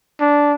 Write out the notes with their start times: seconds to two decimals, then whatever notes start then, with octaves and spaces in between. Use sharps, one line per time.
0.21 D4